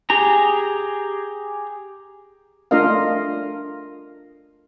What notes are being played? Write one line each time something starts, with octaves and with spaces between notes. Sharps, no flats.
G4 G#4 A#5
A3 D4 F4 A#4 D#5 F5